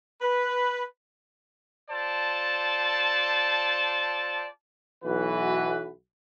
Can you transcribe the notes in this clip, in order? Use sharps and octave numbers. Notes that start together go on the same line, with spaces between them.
B4
F4 A4 C5 D5 A5
B1 E3 F#4 B4